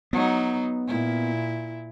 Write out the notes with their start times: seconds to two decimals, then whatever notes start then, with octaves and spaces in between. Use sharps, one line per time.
0.13 F#3 B3 D#4
0.87 A#2 E4